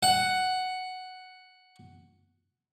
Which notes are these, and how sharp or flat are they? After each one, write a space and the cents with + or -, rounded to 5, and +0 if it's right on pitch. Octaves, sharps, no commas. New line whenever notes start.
F#5 +5